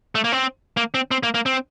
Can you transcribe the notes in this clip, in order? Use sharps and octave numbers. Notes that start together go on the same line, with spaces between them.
A3
A#3
C4
A#3
C4
C4
A#3
A#3
C4